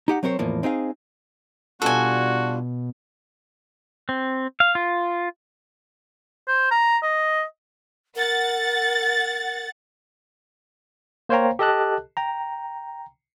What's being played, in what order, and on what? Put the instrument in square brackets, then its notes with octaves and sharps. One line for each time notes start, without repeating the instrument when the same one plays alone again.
[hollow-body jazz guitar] D#4 G4 F#5
F#3 C4 A#4 C5 C#5
E2 A2 F3 A#3
C4 D#4 G#4 F5
[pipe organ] B2 [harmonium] G3 D4 F4 [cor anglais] F#4 [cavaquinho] A4 G#5
[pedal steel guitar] C4
F5
F4
[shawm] C5
A#5
D#5
[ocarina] A#4 [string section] F#5 A6
[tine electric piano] A#3 C5 C#5 F5 G5 A#5
G4 A4 D#5 A5 F#6
G5 A#5